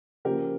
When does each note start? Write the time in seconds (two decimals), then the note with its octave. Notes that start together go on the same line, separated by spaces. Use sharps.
0.25 C#3 F3 A#3 G4 A#4